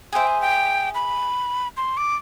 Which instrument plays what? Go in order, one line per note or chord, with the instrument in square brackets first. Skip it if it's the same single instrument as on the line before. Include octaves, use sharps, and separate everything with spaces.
[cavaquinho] G#4 C5 E5 [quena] G5
[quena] G#5
G5
B5
C6
D6